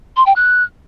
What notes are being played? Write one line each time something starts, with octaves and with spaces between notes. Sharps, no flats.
C6
G5
F#6